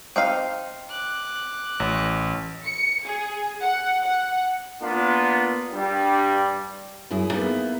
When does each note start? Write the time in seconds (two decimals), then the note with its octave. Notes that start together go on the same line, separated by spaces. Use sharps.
0.16 C4 D#4 F5
0.90 D6 F#6
1.80 A1
2.66 C#7
3.05 G#4
3.61 F#5
4.03 F#5
4.81 A#3 B3 D4 F4
5.71 G2 G3
7.10 F#2 E4 G#4
7.32 A#3 B3 D#4 E4 G#4 A4